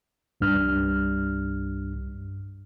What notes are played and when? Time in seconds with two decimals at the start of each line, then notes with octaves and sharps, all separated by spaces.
0.41 C2 G2 F6